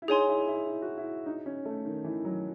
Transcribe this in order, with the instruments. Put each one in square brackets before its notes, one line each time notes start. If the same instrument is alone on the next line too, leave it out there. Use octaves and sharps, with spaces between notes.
[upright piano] E4
[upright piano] D#4 [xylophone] G#4 C#5 G#5 C6
[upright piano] E4
E4
E4
F#4
E4
D#4
C#4
A3
D#3
E3
F#3